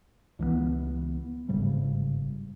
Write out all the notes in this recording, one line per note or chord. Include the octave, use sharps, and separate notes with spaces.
C#2 E3 G#3 B3
G1 G#2 C#3 G3